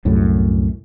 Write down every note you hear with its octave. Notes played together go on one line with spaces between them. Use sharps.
C2 F#2 A2